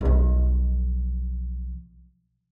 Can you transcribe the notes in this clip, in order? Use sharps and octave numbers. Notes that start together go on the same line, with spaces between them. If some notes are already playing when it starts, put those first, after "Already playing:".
B1 F3